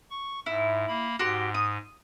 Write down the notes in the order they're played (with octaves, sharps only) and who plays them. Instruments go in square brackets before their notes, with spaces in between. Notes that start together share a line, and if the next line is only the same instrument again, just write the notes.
[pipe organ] C#6
[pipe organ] G#2 [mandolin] E4
[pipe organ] A#3 B5
[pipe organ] G#2 [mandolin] F#4 G4 C6
[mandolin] D#6